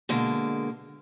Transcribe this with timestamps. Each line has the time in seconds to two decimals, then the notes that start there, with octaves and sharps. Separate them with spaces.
0.09 B2 D3 G#3 A#3